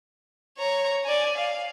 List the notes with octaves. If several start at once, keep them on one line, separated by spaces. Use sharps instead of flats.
C#5 A#5
D5 G#5
F5